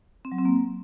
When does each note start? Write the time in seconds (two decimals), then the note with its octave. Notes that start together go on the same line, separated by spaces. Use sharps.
0.25 C4
0.32 F#3
0.38 C4
0.45 A#3